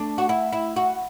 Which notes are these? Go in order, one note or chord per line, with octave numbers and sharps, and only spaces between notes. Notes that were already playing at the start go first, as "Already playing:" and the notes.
Already playing: A3 D4
F#4
E4
E4
F#4